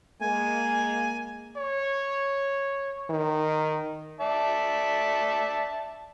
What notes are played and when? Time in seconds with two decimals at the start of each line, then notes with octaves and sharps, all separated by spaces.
0.21 G#3 A#3 G#5
1.57 C#5
3.10 D#3
4.20 D5 E5 A5